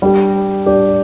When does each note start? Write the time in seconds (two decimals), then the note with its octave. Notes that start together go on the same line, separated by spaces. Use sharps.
0.02 G3 D4 G4
0.66 G3 D4 G4